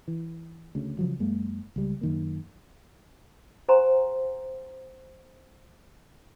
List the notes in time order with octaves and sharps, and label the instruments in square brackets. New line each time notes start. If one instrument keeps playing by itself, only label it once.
[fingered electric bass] E3
D2 C#3
C#3 F3 F#3
F#2 G#3 A#3
C#2 G3
F#2 D#3 A#3
[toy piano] G4 C5 F#5 G#5 A#5 C6